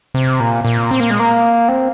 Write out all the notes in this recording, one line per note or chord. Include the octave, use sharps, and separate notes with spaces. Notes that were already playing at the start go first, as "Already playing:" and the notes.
C3
A#2
A#2
C4
A#3
G#3
A#3
C4